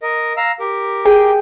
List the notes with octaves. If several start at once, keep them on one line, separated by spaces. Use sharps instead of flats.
A#4 D#5
F5 A#5 E6
G4 A#4
G#4 G5